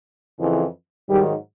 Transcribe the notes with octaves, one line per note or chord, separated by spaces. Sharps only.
F2 C#3 E3
G#2 D#3 F#3 G3